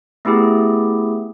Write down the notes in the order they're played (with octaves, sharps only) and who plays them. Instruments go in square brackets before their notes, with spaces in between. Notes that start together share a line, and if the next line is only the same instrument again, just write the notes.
[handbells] A3 B3 E4 G4 G#4